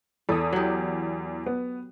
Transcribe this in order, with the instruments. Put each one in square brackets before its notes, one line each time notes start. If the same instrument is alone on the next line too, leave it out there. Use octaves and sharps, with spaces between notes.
[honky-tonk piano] E2 D#6 [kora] A4
[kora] F#3 G4
[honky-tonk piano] B3